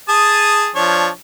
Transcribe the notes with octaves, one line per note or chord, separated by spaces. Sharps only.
G#4 A5 D#6
F3 D4 C#5